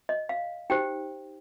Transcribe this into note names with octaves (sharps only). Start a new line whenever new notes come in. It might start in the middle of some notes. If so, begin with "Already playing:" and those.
D#5
F5
D#4 G4 C5 G5